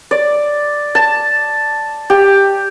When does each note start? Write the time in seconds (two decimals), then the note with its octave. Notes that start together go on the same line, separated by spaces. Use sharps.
0.11 D5
0.95 A5
2.10 G4